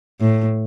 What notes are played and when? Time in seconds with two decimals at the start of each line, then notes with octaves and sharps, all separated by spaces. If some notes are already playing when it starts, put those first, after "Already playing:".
0.21 A2